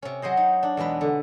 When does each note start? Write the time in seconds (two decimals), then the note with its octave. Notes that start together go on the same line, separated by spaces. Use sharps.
0.02 C3 C#4
0.22 F#3 G#4 C5 D#5
0.37 D#4
0.63 D4
0.77 E2 B2 G#3 B4
1.01 D3